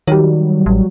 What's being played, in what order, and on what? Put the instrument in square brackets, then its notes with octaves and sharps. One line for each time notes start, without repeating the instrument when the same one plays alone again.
[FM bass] D#3 [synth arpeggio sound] F#3 G3
[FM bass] A1